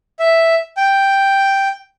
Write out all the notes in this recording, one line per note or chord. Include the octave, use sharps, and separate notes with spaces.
E5
G5